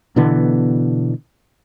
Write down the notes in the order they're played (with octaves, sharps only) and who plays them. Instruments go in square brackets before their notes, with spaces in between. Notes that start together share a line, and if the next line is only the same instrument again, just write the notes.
[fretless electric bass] B2 D3 E3 B3